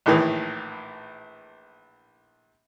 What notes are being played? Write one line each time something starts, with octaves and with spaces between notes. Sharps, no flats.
A#1 A2 D#3 E3